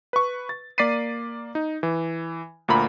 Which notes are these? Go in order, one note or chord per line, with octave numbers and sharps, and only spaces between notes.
B4 C#6
A6
A#3 D5 A6 B6 C7 D#7
D#4
E3
D2 A#2 A#5 B5